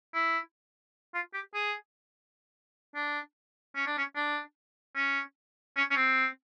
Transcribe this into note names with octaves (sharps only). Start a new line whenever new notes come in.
E4
F4
G4
G#4
D4
C#4
D4
C#4
D4
C#4
C#4
C#4
C4